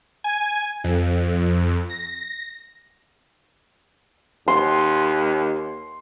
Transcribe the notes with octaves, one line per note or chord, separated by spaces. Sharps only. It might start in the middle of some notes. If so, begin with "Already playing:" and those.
G#5
F2
A#6
D#2 C6